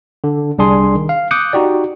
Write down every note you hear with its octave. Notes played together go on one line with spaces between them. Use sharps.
D3
C2 G3 D4 G#4 C6
D#3
F5
D6 D#6 F#6 G6 C#7
D#4 F#4 G4 D5